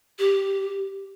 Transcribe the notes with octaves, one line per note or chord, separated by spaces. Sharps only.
G4